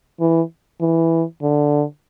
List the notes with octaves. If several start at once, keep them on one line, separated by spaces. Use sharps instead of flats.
E3
E3
D3